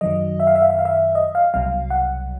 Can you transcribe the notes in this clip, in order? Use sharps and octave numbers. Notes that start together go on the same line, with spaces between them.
F#2 D#3 F#3 D#5
E5
F5
E5
F5
E5
F5
E5
D#5
F5
C2 B2 F#3 F5
F#5